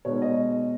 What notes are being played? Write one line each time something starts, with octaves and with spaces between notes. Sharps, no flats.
B2 G#3 D#4 C#5
D#5